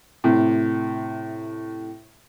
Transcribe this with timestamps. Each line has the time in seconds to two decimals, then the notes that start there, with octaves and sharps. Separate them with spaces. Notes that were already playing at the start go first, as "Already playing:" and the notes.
0.24 A2 C3